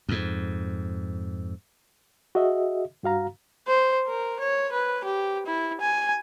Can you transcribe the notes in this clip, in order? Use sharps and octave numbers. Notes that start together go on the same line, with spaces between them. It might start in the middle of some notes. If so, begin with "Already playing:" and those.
F2 G#2
F#4 G#4 D#5 E5
G2 F#4 F5 A#5
C5
A#4
C#5
B4
G4
E4
G#5